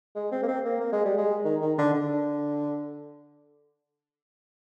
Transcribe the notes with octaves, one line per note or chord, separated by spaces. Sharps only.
G#3
C4
A#3
C4
A#3
A#3
G#3
G3
G#3
D#3
D#3
D3
D3